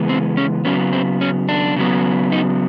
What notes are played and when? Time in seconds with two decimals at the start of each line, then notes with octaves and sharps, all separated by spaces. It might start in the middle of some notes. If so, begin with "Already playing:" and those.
Already playing: C#3 E3 G#3 B3
0.09 C4
0.37 C#4
0.65 C#3 F#3 B3 C#4
0.93 C4
1.21 C#4
1.49 D4
1.76 C#3 F#3 B3
2.32 D#4